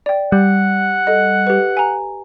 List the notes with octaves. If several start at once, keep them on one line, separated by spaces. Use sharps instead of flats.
D5 G5
G3 F#5
A4 D#5
G4 B4
G#5 A#5